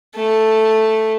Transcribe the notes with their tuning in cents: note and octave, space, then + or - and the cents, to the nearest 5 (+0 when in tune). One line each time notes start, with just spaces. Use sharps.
A3 +0 A4 +0